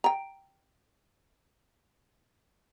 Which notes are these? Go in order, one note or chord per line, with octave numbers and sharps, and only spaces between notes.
G5 A#5